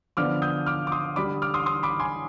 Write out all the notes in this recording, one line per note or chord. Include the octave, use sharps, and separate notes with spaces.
D3 F3 B3 D4 D6 F6
D#6 G6
D6 F6
D6
C6 D#6
D3 G3 D4 B5 D6
D6 F6
C6 D#6
C6 D#6
B5 D6
G#5 C6